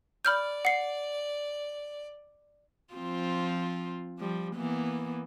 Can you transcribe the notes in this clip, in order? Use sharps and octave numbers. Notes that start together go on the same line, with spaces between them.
D5 B5 F6 G6
F#5 C7
F3 C4 F4
F3 G3
E3 A#3 B3